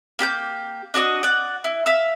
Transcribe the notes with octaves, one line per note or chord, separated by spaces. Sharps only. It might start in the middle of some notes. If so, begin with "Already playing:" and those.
A#3 G4 A5 G6
D4 F#4 C#5 D#5
D5 F#5
E4
E5 F5 E6